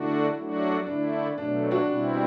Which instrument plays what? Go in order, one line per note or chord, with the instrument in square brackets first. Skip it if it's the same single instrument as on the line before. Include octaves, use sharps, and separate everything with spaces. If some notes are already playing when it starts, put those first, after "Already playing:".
Already playing: [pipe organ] D3 A3 D4 F#4 [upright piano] E4
[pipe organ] F#3 A3 D4 F#4
[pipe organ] D3 A3 E4 [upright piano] D4
[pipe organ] B2 F#3 A3 [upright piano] D4
[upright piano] D4 F#4
[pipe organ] B2 G3 C4 E4